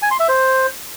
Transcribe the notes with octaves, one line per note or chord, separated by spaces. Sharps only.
G#5
C6
E5
C5